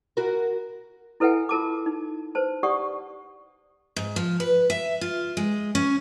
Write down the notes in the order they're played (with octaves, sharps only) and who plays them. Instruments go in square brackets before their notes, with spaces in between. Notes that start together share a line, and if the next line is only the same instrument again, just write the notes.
[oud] F#4 A#4
[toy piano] E4 A4 B4 E5 F#5 G#5
F4 A#4 A5 D6
D#4
B4 C5 A5
G4 D5 F#5 C#6 D#6
[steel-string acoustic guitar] G#2
F3
B4
E5
F4
G#3
C#4